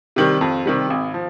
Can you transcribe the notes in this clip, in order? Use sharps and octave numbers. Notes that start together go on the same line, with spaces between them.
C3 D#3 G3
F2
C3 D#3 G3
G#1
F3